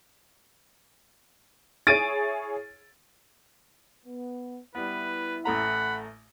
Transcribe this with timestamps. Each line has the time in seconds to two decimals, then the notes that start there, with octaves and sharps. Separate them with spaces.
1.87 E4 G#4 C#5 A6 D7 D#7
4.06 B3
4.75 G3 B3 E4 B4
5.45 A1 A3 F#5 A#5 B5